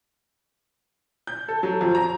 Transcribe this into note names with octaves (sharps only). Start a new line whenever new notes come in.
G6
A4
F#3
F2
A#5